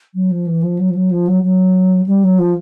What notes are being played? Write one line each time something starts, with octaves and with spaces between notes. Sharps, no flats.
F#3
F3
E3
F3
F#3
F3
F#3
F3
F#3
F#3
G3
F#3
F3